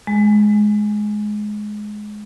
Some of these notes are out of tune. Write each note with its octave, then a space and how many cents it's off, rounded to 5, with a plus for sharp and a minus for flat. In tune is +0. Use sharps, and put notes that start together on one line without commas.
G#3 +15